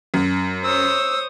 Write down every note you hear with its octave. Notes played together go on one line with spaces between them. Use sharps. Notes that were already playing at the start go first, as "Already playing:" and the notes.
F#2
C5 C#5 D#6 E6